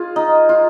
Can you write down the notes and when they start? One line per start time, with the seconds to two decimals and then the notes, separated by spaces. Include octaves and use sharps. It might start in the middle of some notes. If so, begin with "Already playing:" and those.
Already playing: F4 G#4
0.16 D#4
0.49 F4